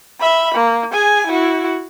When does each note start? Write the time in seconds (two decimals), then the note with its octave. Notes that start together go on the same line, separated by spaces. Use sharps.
0.20 E5 B5
0.55 A#3
0.91 G#4 G#5
1.27 E4 F#4